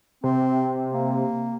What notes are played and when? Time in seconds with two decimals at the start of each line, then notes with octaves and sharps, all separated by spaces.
0.24 C3 C4
0.93 A#3